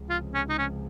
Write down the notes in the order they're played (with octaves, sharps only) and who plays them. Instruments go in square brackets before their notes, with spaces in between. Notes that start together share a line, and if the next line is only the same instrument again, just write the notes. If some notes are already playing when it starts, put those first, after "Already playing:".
Already playing: [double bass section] C#2 C3 F3 G#3
[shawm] F4
C#4
D#4
C#4